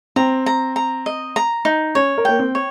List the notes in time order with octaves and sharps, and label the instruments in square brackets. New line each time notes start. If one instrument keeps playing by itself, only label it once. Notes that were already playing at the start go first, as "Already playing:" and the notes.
[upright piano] C4 [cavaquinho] A#5
[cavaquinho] A#5
A#5
D#5
A#5
D#4
[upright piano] C#4 [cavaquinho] C#5
[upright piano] A#4
[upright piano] A#3 [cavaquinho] G5
[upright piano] C4
[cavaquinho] C#5